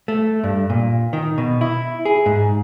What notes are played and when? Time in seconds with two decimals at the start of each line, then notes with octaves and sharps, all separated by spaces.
0.08 A3
0.44 G2
0.70 A#2
1.13 D#3
1.38 B2
1.61 E4
2.05 G#4
2.26 G#2